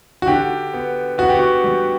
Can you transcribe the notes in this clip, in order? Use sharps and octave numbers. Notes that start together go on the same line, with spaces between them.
F#4
D3 G4
B3
B3 F#4
G4
F#4
G3